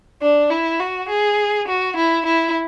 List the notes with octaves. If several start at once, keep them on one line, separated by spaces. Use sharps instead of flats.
D4
E4
F#4
G#4
F#4
E4
E4